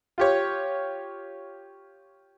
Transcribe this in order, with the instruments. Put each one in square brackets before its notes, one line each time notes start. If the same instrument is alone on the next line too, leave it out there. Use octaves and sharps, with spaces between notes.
[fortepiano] F4 G4 C#5